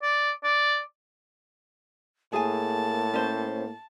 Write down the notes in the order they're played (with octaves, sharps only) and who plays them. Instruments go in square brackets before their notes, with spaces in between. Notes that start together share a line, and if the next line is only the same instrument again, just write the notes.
[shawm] D5
D5
[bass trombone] A2 [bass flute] A#3 [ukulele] G#4 G#5 [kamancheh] A5
[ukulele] C#4 C5